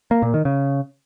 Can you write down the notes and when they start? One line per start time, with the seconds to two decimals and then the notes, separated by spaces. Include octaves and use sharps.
0.11 A#3
0.22 A#2
0.34 D#3
0.45 C#3